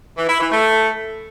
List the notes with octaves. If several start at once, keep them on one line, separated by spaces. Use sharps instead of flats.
E3
E4
E3
A3